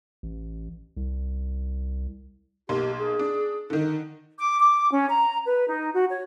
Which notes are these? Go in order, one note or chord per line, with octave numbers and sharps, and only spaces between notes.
A1
C2
B1 A#3 G4 C6
G#4
D4
D3 D#3 D#4
D6
D6
C#4
A#5
B4
D#4
F#4
C#5